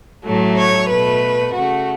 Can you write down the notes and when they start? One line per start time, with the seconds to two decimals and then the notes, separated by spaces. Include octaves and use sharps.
0.24 A2 F#3 A3
0.57 C#5
0.89 B2 A3 B4
1.53 C#3 A3 F#4